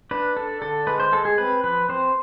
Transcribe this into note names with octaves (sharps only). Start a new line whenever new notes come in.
D4 B4
D4 A4
D3 A4
G#3 B4
C5
G#3 A4
G#4
C4 B4
F3 B4
C4 C5